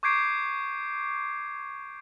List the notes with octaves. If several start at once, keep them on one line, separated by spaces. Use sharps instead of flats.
C#6 D6 G6 G#6 C7 D7